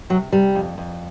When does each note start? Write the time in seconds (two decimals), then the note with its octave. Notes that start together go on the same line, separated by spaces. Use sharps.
0.10 C3 F#3
0.32 C3 G3
0.55 F2
0.78 F2